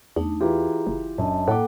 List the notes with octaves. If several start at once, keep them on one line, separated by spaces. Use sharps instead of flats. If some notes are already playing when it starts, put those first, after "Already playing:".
E2 A3 D4 D#4
E3 F4 G4 G#4 A#5
F#1
F#2 D4 D#5 A5
A2 A#3 A4 F#5 G5 D6